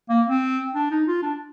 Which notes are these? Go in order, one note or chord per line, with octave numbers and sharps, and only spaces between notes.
A#3
C4
D4
D#4
F4
D4